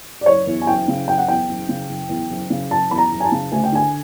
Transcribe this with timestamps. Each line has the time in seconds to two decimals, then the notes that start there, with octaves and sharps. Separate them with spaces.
0.21 D5
0.26 F#1 C#5
0.47 E2
0.62 G#5
0.67 F#1 G5
0.88 C#3
1.07 F#1 G5
1.18 F#5
1.28 E2 G5
1.49 F#1
1.69 C#3
1.89 F#1
2.09 E2
2.30 F#1
2.50 C#3
2.70 F#1 A5
2.91 E2 B5
2.98 A#5
3.11 F#1
3.20 G#5
3.24 A5
3.32 C#3
3.52 D2 G#5
3.64 G5
3.73 D3 G#5